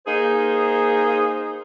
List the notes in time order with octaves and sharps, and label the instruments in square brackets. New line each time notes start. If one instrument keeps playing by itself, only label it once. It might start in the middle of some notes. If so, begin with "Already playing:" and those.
[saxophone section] A#3 D#4 G#4 C5